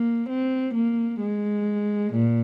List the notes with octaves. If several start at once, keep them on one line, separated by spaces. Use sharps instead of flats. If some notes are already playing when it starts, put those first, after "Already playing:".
Already playing: A#3
C4
A#3
G#3
A#2